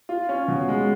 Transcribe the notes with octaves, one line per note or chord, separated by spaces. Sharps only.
F4
C#4
B2
G#3